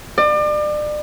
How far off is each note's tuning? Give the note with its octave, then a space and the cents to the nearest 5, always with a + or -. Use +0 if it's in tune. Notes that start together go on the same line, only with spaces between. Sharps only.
D5 +35